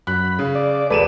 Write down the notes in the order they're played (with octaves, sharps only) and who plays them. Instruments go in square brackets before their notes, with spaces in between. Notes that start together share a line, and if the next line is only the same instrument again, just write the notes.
[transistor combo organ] F#2 B5 [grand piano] F#6
[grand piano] C#3
[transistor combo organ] D5
[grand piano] E1 D#7 E7 [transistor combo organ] A4 B4 D5